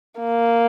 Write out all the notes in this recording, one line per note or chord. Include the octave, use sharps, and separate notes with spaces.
A#3